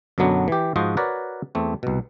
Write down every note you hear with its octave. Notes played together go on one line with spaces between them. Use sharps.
F#2 B2 D3 F#3 B3 D4
E3 G4
G#2 F3 F#4 C5 D#5
F#4 A#4 B4 C#5 D5
E2 A3 C4
C2 B2